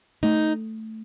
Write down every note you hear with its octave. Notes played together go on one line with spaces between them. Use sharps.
A3 D#4